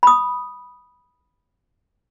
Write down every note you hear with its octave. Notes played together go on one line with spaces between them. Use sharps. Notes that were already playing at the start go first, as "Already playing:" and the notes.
B5 D#6